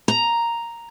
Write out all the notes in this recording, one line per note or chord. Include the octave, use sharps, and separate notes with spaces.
A#5